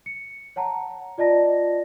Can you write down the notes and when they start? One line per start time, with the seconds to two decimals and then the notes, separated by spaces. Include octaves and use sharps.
0.06 C#7
0.56 C#5 F#5 A5 A#5
1.18 F4 D5 D#5 A5 A#6